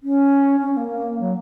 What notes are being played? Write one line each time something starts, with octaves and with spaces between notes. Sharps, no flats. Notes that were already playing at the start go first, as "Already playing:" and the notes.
C#4
C#4
A#3
F#3